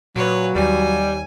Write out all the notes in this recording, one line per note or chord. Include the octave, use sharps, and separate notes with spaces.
A#2 F#3 B4 C#5
D#2 G3 G#5